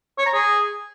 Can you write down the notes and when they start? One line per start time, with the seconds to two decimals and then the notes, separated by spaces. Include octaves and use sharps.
0.18 C#5
0.26 A#5
0.34 G#4